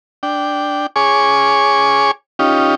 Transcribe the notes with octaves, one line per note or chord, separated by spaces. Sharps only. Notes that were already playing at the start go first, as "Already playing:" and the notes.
D4 G5
G#4 C#5 G#5 C#6 D6
C#4 D#4 F4 G4